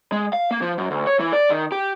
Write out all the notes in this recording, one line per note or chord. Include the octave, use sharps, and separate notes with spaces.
G#3
F5
A#3
F3
F#2
D2
C#5
E3
D5
D#3
G4